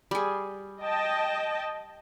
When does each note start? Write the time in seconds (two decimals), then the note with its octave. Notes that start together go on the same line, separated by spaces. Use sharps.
0.11 G3 G#4
0.82 D#5 G5 A5